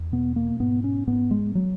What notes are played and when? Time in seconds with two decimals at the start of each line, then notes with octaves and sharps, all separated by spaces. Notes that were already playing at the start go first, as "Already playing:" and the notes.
Already playing: E2
0.12 B2 B3
0.36 A#3
0.60 G#2 B3
0.84 C#4
1.07 G#2 B3
1.31 G#3
1.55 F#3